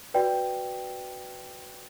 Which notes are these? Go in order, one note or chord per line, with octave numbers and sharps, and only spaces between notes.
F#4 B4 D5 G5